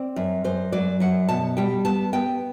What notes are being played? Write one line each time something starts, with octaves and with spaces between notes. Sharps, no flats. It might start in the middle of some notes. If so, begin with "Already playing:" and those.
Already playing: C4 D5
F#2
F#2 C5
F#3 D5
F#2 F#5
B2 A5
G3 G5
B3 A5
B3 G5